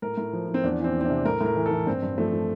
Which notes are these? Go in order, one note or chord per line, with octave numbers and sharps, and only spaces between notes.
A2 A#4
A2
F3
F3
C4
E2 D4
E3 C4
E2
C4
C3 D4
A2 A#4
A2
A#4
E3
A4
E3
G2 C4
G2
F3 A3
F3